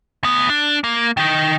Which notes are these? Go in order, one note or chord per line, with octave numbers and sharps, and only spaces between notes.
D2 B3
D4
A#3
D#3 D#4